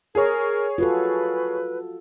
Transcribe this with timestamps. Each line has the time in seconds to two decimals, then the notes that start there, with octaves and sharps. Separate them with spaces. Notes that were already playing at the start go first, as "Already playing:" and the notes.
0.15 G#4 A#4 C#5
0.78 F4 F#4 A4 B4